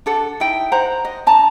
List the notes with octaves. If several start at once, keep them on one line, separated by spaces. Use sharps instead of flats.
D4 A4 F#5
D#4 E4 G5
C5 F#5 A#5
D#5
D4 A5 A#5